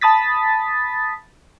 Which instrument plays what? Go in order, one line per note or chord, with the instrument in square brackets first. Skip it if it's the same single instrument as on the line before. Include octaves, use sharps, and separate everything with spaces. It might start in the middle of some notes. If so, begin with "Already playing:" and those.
[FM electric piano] A5 B5 D#6 A6 B6